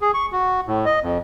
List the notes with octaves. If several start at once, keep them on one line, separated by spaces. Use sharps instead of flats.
G#4
C#6
F#4
A2
D#5
F2